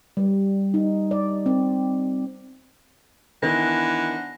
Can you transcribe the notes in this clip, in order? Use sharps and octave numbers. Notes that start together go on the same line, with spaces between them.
G3
D#4
D5
C4
D#3 E3 B3 D4 D#4 C5 F#5 A#6